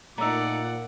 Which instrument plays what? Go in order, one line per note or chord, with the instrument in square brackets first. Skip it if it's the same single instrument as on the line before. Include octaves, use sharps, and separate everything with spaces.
[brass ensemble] A#2 [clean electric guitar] A3 D#4 [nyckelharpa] D5 F#5 [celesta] A#5 E6